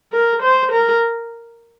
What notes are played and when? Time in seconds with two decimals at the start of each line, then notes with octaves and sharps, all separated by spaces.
0.12 A#4
0.43 C5
0.72 A#4